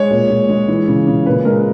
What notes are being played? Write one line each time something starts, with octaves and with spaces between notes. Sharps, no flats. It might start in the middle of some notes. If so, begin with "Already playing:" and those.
Already playing: G#3 C#5
A#2
A#2
G#3
E3
C#3
C#3
A#2 B4
G#3 A#4